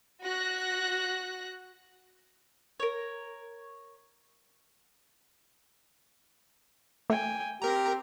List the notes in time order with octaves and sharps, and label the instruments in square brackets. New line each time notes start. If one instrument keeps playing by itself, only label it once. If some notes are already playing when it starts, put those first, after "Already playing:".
[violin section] F#4 F#6 A#6
[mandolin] A#4 C#5
[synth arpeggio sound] A3 [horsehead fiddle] G5 G#5
[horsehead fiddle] C4 [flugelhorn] G4 [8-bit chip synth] A#4 A#5